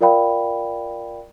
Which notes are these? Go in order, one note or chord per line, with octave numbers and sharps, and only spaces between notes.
F4 A#4 D5 F5 G5 B5